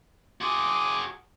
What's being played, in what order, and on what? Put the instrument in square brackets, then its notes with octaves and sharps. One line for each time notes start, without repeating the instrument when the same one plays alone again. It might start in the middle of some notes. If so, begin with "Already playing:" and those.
[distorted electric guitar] F#4 G#4 [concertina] C6 D6